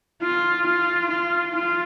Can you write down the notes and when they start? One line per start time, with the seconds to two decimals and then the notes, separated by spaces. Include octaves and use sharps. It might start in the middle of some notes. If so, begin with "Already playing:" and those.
0.22 F4
0.67 F4
1.11 F4
1.55 F4